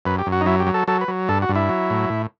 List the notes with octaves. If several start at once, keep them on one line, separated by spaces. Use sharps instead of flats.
F#2 B4
G4
F#2
F#4
D#4
F#3 E4
G4
F#3
A4
F#3 A4
B4
F#3
G2 A4
F#4
G2
E4
F#3
A2
A2